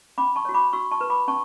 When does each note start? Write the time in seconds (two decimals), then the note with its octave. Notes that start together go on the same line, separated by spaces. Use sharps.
0.18 C#4 B5 D6
0.36 A5 C#6
0.45 F#4 C#5
0.54 B5 D6
0.73 F#4 C#6 E6
0.91 A5 C#6
1.01 B4
1.10 B5 D6
1.28 C#4 A5 C#6